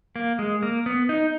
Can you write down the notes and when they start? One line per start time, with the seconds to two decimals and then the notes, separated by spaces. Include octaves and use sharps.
0.16 A#3
0.39 G#3
0.62 A#3
0.86 B3
1.09 D#4